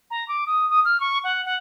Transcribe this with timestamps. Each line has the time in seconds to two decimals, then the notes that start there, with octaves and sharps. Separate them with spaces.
0.11 A#5
0.28 D6
0.47 D#6
0.70 D#6
0.85 F6
1.00 C#6
1.24 F#5
1.45 F#5